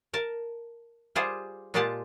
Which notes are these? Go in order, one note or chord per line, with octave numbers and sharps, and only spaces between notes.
A#4 A5
G3 F4 G4 G#4 C5 F#5
A#2 G#3 F4 G4 F#5 A5